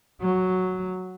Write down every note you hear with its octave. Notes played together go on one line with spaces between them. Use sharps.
F#3